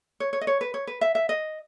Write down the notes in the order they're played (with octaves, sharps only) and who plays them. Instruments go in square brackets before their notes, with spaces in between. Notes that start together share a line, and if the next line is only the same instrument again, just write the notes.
[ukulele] C#5
C#5
D#5
C#5
B4
C#5
B4
E5
E5
D#5